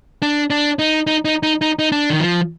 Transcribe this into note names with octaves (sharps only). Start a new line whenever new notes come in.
D4
D4
D#4
D#4
D#4
D#4
D#4
D#4
D4
D#3
F3